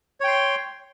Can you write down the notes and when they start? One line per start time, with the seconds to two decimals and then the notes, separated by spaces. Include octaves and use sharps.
0.21 C#5
0.24 G5
0.28 C6